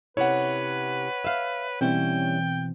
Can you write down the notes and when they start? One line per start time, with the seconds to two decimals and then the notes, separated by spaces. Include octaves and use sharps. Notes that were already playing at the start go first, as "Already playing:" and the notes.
0.17 C3 C#4 E4 B4 C#5 F#5
1.25 E5 F5
1.81 B2 E3 G3 C4 C#4 E4 G5